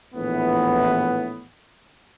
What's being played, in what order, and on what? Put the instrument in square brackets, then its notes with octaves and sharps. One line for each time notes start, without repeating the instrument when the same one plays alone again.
[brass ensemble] A#1 A2 E3 B3